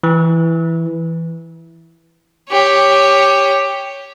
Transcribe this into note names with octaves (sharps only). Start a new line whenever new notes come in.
E3
G4 C#5